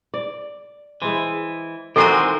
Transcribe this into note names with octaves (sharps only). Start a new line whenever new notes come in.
D5
E3 G#3 E4 C5
D#3 E3 G#3 C4 F#4 A4 F#5 A#5